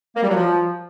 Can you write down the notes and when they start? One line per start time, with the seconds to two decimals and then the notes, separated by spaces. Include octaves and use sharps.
0.16 A#3
0.23 G3
0.29 F#3
0.36 F3